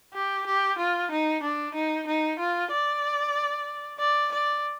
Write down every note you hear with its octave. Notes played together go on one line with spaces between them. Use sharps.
G4
G4
F4
D#4
D4
D#4
D#4
F4
D5
D5
D5